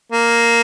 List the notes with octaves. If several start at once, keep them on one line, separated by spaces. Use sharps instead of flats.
A#3